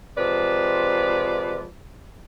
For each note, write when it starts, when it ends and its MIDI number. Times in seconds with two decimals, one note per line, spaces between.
0.18 1.67 48
0.18 1.67 53
0.18 1.67 56
0.18 1.67 71
0.18 1.67 74